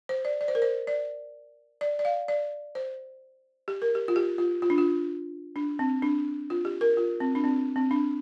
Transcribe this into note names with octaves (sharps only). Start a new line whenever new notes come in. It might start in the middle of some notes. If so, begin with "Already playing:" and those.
C5
D5
D5
C5
A#4
C5
D5
D5
D5
F5
D5
C5
G4
A#4
G4
F4
G4
F4
F4
D4
F4
D4
C4
D4
F4
G4
A#4
F4
C4
D4
C4
C4
D4